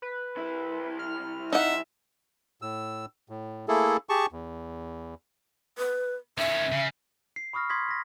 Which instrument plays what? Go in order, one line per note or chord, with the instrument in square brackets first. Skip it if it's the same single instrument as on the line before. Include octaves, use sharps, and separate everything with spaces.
[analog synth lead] B4
[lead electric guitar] C2 E4
[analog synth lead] F6
[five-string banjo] D#4 F#5 [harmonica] E5
[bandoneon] A2 E6
A2
A3 A#3 E4 G#4 A4
G4 G#4 A5 C#6
E2
[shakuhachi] B4
[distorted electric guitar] D#3 C#4 [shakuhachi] E5
[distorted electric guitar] C#3
[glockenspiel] C7
B5 C#6 D#6 F6 A#6
C6 D#6 G#6 A#6 B6
A#6 B6